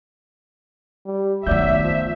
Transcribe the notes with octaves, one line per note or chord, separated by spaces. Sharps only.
G3
D#3 F#3 A3 B3 D5 E5 G6
F3